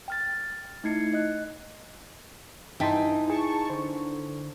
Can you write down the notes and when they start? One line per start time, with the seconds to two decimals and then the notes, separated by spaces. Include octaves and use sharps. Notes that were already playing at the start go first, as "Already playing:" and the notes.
0.08 G5 F6 A6
0.84 A3 D#4 E4 G#6 C7 C#7
1.13 D#5 F#6
2.80 G2 E3 D#4 E5 G5 A5 C6 B6
3.28 E4 G#4 A5 C#6
3.70 D3 C5 C#6